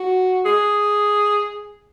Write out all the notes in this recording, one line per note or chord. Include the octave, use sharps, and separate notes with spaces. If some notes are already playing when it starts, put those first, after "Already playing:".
Already playing: F#4
G#4